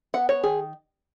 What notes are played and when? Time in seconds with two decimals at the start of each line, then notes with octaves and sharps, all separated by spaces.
0.14 B3 F#5
0.29 C#5
0.43 D#3 G#4